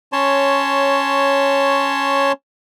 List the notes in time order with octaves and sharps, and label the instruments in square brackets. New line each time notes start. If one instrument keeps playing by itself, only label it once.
[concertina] C#4 C#5 A5 C6